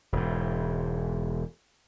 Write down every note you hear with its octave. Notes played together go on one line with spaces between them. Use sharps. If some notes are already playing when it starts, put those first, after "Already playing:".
E1 G#2